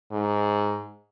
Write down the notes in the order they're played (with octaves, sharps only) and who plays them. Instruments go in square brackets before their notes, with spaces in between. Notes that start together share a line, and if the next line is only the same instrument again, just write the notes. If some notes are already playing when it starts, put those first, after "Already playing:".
[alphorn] G#2